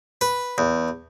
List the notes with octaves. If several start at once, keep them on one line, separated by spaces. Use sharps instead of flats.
B4
E2